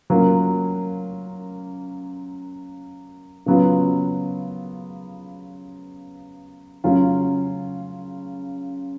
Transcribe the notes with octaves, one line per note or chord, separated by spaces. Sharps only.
F#3 A#3 C#4 F4
C#3 F#3 B3 F4
C#3 F#3 C#4 F4